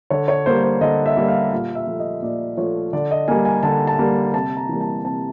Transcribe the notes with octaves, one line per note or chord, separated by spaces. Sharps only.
D3 C#5
C#5
G3 A#3 C5
C5
D3 D#5
E5
G3 A#3
F5
A#2 F5
E5
F3 A3
D#5
A#2 D5
F3 A3 C#5
D3 D5
D#5
G3 A#3 G#5
G#5
D3 A5
A5
G3 A#3
C3 A5
A#5
E3 G3 A#3
A5
C3 A5